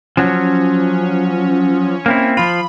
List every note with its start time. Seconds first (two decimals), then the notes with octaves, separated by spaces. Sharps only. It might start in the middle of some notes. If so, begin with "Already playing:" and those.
0.17 F3 F#3 C#4
2.06 A#3 C4 E4
2.37 F3 F4 B5